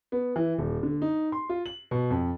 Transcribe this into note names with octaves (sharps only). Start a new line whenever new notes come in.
B3
E3
D#1
D3
D#4
C6
F4
F#7
B2
F2